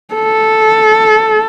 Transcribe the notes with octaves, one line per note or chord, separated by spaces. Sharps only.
A4